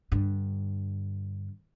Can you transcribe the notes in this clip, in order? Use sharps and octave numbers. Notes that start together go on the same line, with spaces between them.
G2 D3